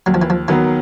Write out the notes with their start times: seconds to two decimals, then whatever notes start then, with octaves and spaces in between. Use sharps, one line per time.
0.06 D#2 F#3
0.14 F3
0.22 E3
0.30 F3
0.48 D#3 E3 F#3 B3